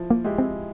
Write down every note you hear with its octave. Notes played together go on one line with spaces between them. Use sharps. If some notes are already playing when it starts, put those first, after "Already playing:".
Already playing: F3 E4
A#3
G#3 E4 G4
C4